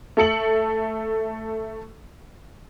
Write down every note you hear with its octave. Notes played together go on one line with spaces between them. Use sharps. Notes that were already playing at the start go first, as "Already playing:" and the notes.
A3 A4 C#7 F#7